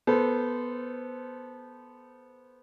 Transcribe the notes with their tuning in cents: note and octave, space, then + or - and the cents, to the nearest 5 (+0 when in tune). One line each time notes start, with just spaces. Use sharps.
B3 -10 A4 -10 C5 -20